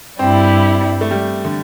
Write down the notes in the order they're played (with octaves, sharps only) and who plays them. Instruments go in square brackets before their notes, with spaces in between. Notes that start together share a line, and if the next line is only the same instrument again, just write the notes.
[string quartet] G2 G3 E4 [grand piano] C4
[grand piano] A3
G3
D3